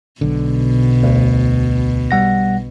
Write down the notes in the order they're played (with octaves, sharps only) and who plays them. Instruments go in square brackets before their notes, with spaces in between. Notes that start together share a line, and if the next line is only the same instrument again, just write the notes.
[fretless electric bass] B1 D3 [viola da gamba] B2
[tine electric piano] D2
G3 F#5 A#6